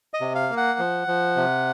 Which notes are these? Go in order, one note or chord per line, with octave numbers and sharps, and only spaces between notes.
D#5
C3
F5
A#3
F#5
F3
F3
C3